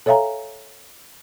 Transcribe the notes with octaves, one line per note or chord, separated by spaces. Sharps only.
A4 C#5 E5 F5 G#5 A#5